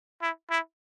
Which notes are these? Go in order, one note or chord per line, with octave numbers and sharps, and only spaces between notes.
E4
E4